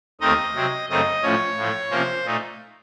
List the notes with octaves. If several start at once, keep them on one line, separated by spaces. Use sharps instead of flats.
D#2 D#3 A3 C4 D#4 D#5
C3 F#3 C4
F#2 C#3 A3 C4 D#4 D#5
A2 F3 A3 C#4 C#5
A2 F3 A3
C3 F3 A#3 C#4 C5
A#2 A3 D#4